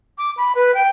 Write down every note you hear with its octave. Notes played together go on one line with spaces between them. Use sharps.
D6
B5
B4
G5